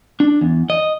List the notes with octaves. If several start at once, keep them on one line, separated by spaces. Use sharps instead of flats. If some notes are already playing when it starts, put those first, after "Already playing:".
D4
E2
D#5